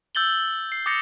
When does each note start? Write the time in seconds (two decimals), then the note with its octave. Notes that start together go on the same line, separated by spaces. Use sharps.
0.15 E6 G6 A6 F#7 G7
0.72 C7
0.86 D6 D#6 G6 A6 A#6 C#7